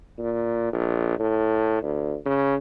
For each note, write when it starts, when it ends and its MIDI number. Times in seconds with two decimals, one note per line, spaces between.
0.18 0.70 46
0.73 1.15 34
1.19 1.79 45
1.82 2.16 38
2.25 2.55 49